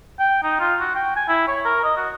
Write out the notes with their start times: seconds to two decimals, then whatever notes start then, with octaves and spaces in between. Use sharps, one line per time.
0.19 G5
0.43 D#4
0.59 F4
0.80 F#4
0.95 G5
1.16 G#5
1.28 E4
1.48 C#5
1.65 A#4
1.84 D#5
1.97 F#4